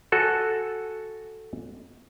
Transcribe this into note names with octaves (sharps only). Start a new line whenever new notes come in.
F#4 A4 G#5